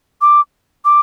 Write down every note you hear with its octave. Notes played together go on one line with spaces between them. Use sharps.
D6
D6